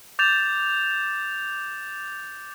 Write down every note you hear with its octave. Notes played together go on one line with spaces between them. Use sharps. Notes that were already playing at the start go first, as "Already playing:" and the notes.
D6 G6 A6 E7 F7